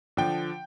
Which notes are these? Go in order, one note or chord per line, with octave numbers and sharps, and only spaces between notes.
D3 F3 G5